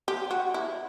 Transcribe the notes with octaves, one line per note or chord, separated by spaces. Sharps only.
G4
F#4
E4